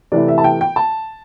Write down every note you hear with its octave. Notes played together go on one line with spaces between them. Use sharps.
C3 E3 A3 E4 D5
E5
A5
G5
G5
A5